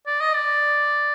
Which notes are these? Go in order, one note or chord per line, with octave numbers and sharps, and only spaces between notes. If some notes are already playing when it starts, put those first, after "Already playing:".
D5
D#5
D5